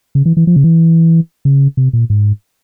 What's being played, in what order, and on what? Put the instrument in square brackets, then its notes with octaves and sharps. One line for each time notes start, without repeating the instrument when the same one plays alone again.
[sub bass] C#3
E3
E3
F3
C#3
E3
C#3
C3
A#2
G#2